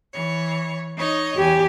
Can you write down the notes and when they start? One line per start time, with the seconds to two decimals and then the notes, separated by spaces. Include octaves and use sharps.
0.12 E3 C#5
0.96 D#4 C#5 D#5
1.37 E2 G4 G#5